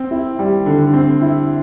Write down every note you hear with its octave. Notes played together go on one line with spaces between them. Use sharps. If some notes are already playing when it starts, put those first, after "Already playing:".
Already playing: C4
E4
G3
D3
C4
E4